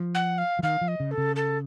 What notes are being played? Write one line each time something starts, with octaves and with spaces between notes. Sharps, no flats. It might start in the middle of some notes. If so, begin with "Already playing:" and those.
Already playing: F3
F#5
F5
F3
D#3 F5
F3
D#5
C#3
A4
C#3
A4